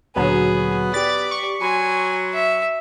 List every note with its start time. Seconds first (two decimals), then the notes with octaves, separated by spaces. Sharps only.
0.16 D2 A#2 D3 F#3 B3 G#4
0.94 G4 D5 A6 B6
1.31 C#6
1.62 F#3 G#5 B5 C6
2.34 E5